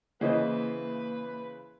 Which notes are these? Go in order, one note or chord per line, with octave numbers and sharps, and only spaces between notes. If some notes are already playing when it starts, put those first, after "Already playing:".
C#3 E3 A#3 E4 B4 C5 D#5